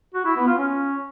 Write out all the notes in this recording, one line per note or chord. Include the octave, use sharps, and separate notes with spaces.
F#4
E4
B3
F4
C#4